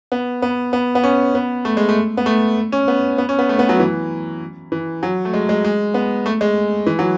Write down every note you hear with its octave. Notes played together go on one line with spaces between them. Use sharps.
B3
B3
B3
B3
C#4
B3
A3
G#3
A3
B3
A3
C#4
B3
B3
C#4
B3
A3
B3
F#3
E3
E3
F#3
A3
G#3
G#3
G#3
B3
A3
G#3
E3
F#3